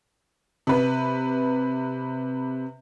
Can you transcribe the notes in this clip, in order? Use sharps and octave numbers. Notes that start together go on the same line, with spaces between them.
C3 B4